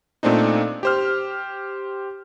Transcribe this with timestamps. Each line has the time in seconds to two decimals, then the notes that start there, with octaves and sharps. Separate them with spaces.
0.23 A#2 A3 C4 D4 D#4
0.83 G4 C5 F6